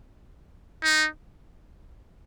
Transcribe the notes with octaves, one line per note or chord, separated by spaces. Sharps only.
D#4